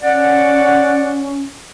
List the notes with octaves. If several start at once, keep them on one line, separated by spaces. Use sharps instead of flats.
C#4 D5 F#5